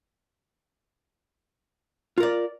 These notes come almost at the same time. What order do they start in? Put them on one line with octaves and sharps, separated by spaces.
F4 A#4 D5